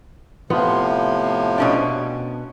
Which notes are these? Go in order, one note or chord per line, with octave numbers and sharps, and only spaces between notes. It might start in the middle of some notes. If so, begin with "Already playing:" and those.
A2 C3 F3 B3 F4
B2 C#4 D4